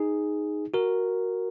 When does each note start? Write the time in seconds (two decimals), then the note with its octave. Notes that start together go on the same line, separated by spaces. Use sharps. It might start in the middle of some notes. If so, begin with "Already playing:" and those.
Already playing: D#4 G#4
0.74 F#4 A#4